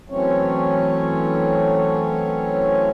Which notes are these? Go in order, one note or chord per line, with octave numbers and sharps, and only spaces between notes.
E3 F#3 A3 C4 C#4 C#5